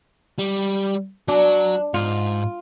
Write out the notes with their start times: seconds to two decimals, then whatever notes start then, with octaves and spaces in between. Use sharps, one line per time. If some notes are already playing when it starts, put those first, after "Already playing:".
0.39 G3
1.28 F#3 D4
1.94 G#2 F4